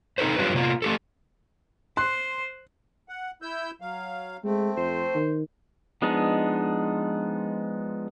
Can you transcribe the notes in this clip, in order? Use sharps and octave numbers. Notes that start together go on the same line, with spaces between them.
C4 D#4 A4 B4 C5
F#3 G3 D4 F4 G4 B4
C3 A#3 F4
A3 G4 A4
C5 C6 F#6
F#5
E4 E6 G6
F#3 F5
G#3 A3 C4
F2 C5
D#3
F3 G#3 B3 D4 D#4